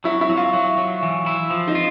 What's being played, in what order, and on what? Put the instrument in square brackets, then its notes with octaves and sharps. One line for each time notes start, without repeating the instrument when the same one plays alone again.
[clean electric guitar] F#3 [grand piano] E4
[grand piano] E4
[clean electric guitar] F#3
[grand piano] F4
[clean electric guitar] F#3
F#3
E3
E4
F3
[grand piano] D#4
[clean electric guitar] F4